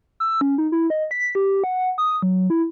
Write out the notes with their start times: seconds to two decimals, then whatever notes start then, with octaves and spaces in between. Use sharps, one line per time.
0.20 E6
0.41 C#4
0.58 D#4
0.72 E4
0.90 D#5
1.11 B6
1.35 G4
1.64 F#5
1.98 D#6
2.22 F#3
2.50 E4